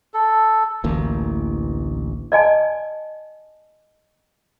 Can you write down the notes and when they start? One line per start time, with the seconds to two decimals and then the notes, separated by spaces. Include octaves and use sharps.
0.14 A4
0.84 A1 D2 E3 A#3
2.32 D5 D#5 G#5 A5